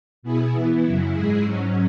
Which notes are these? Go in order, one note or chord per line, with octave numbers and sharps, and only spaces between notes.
B2 B3 E4 G#4
E3 B3 E4
F#2 C#3 F#3 E4
G#2 G#3 E4 G#4
G#2 F#3 C#4